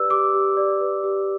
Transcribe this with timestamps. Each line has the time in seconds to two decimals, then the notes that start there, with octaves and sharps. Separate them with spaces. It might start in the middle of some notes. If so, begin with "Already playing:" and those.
Already playing: G4 B4 D5 E6
0.10 G4 D6
0.34 G4
0.57 D5
0.80 B4
1.03 G4